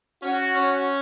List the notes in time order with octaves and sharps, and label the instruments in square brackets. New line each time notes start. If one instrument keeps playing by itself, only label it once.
[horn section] C#4 [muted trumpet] F#4
[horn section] C#4